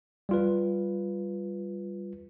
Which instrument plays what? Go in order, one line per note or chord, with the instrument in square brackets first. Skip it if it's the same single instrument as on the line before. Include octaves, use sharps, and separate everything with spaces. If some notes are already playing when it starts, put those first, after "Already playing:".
[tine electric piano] G3 F4 B4